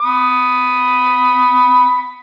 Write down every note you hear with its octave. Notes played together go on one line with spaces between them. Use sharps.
B5 D#6